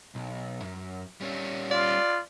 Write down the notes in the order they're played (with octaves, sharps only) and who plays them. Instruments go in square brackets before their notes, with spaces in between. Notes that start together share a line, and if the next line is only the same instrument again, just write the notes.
[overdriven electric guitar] B1
F#2
G3 C#4
[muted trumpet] F4 [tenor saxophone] D5